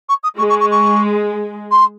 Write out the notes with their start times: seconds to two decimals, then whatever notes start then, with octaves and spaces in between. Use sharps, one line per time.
0.09 C#6
0.23 D#6
0.38 G#3 C#6
0.49 C#6
0.60 C#6
0.71 C#6
1.71 C6